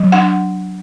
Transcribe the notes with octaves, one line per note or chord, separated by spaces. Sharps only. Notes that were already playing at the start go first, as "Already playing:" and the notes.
Already playing: F#3
D4 F#5